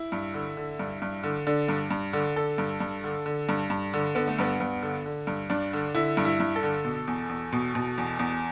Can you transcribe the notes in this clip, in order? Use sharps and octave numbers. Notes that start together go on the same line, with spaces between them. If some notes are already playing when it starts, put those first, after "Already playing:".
Already playing: E4
G2
D3
D3
G2
G2
D3
D3 D4
G2
G2
D3
D3 A4
G2
G2
D3
D3
G2
G2
D3
D3 B3
A3
G2 B3
G2 B3
D3
D3
G2
G2 D4
D3
D3 E4
G2
E4
G2
A4
D3
B2
E2
E2
B2
B2
E2
E2